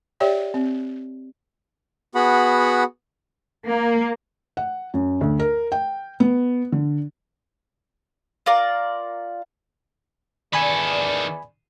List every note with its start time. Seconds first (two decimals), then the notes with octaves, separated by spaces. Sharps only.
0.20 G4 C#5 D5 E5 G5
0.54 C4
2.15 B3 F#4 G#4 F#5 B5
3.65 A#3
4.57 F#5
4.94 F#2
5.21 D2
5.40 A#4
5.72 G5
6.20 B3
6.72 D3
8.46 F4 A#4 D5
10.53 E2 D#3 A4 D5 G#5 B5